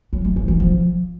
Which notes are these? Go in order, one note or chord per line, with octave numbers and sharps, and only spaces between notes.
F#3
A3
F3
E3
F3